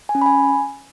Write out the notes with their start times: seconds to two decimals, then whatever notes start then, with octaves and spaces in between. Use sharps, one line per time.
0.09 G#5
0.15 C#4
0.22 B5
0.26 G#5